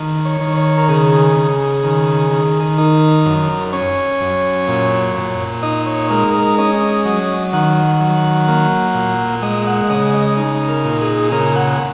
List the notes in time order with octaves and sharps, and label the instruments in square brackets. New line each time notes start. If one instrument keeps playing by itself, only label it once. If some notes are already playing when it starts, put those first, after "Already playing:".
Already playing: [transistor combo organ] D#3
C#5
D#3
C#5
A#4
C#3 G#4
C#3
D#3
D#3
D#4 A#4
F#2
C#4 C#5
F#2
A#2
A#2
D#4 D#5
C#5
G#3 A#4
A#4
C#4 D#5
F#3
D#3 F#5
F#3
A#3
A#2
G#3 D#5
F#5
C#3 D#5
D#5
D#4
A#4
A#2
G#4
C#3 A#4
F#5